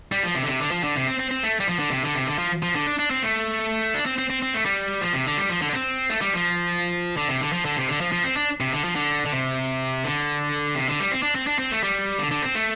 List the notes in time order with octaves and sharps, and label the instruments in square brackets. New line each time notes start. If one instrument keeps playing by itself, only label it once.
[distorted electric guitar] G3
F3
C3
D3
C3
D3
F3
D3
C3
C4
C4
C4
A3
G3
F3
D3
C3
D3
C3
D3
F3
F3
D3
D4
D4
C4
A3
D4
C4
C4
C4
C4
A3
G3
F3
C3
D3
G3
F3
D3
D4
C4
A3
G3
F3
D3
C3
D3
F3
D3
C3
D3
F3
F3
C4
D4
C3
D3
F3
D3
D3
C3
D3
C3
D3
G3
C4
D4
C4
D4
C4
A3
G3
D3
D3
C4
A3